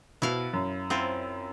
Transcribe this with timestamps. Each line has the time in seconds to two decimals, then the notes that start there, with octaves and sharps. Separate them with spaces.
0.22 B2 E4 F5
0.53 F#2
0.90 C4 E4 F4